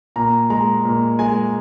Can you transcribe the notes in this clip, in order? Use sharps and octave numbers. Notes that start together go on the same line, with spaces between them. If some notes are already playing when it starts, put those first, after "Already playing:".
A#2 A#5
G#3 A#5
A#2
G#3 G#5